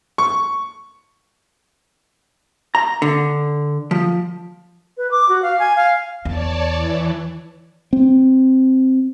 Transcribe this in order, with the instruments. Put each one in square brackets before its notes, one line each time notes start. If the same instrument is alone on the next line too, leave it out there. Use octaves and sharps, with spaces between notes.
[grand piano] C#6
[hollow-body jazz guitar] A#5
D3
F3
[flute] B4
D6
F#4
F5
G#5
F5
[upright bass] E2 [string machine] C#5 D5 A5
[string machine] E3
[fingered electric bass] C4